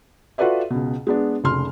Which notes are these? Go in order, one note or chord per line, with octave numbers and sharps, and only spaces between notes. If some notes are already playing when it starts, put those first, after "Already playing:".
F4 F#4 A4 B4 D5 E5
C#2 B2
G#3 B3 D4
F1 C#2 C6 F6